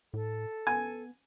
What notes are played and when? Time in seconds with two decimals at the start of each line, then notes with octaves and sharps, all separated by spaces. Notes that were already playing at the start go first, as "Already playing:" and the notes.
0.14 A2 A4
0.67 B3 G#5